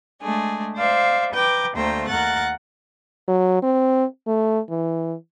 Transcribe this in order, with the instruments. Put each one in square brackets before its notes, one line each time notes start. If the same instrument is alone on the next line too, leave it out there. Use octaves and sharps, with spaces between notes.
[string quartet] G#3 A3 D4 G#4
C5 D5 E5 F5
B4 G5 A#5 D6
D2 A3 A#3 C5 G5 A#5
D#2 A#4 F#5 F#6 A6
[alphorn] F#3
C4
A3
E3